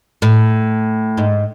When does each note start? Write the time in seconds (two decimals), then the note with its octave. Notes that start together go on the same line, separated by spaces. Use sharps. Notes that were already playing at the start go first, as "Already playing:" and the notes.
0.22 A2
1.17 G#2